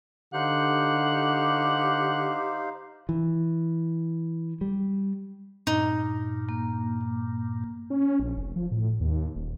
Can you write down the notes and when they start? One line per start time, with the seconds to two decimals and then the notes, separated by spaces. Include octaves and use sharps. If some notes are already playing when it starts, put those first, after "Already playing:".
0.34 D3 D#4 G4 C5 F5 F#5
3.09 E3
4.61 G3
5.67 G2 A#2 D#4
6.49 A#3
7.90 C#4
8.20 A#1
8.37 F1
8.56 F3
8.71 A2
9.00 D#2
9.36 D#1